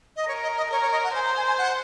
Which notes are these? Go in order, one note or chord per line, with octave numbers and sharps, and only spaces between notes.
D#5
A#4 C#5
D#5
D#5
A#4 C#5
C#5
D#5
F#5
C5 G#5
A#5
G#5
G#5
F#5